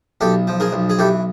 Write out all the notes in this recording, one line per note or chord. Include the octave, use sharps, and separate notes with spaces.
B1 G4 A4
F3
G#4 A#4
B1
G#4
E3 G4 A4